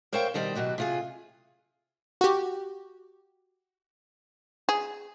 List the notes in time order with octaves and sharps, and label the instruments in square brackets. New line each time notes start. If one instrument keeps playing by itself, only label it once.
[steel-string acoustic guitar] A#4 C5 C#5 E5 F5 G5
B2 D#3 G3 C5
B2 F#3 F#4 G4
C3 F4 G#4
[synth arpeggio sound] F#4 G4
[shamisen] G#4